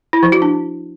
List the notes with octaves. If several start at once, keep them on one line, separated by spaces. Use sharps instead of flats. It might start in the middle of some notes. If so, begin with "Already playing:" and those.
E4
F3
F#4
D4